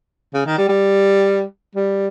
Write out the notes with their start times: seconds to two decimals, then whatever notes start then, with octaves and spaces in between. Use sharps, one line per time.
0.34 C#3
0.46 D#3
0.58 G3
0.69 G3
1.75 G3